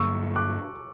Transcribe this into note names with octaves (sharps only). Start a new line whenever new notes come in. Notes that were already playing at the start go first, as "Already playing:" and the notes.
Already playing: G2 D3 F#3 A#3 C#6 E6
D6 F#6